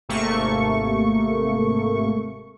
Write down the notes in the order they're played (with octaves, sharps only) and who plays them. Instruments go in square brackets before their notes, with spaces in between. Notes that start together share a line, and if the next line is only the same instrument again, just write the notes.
[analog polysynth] G#1 C3 A3 A#3 C#6